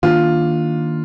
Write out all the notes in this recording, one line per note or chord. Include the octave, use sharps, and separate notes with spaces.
D#3 A#3 D4 F4